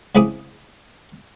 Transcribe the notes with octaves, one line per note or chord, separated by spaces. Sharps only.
C#3 C4 E4 G#4 D6 D#6